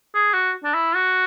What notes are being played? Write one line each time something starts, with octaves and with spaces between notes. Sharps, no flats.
G#4
F#4
D4
E4
F#4